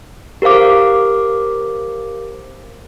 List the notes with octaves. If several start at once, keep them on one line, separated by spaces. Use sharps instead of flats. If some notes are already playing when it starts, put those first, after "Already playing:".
G4 A#4 C5 F5 D6